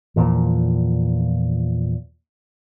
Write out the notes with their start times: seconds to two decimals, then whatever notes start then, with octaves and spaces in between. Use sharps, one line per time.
0.16 E2 A#2 F3